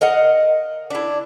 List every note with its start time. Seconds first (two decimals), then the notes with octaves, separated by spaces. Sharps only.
0.01 A#4 D#5 F5 F#5
0.90 D4 E4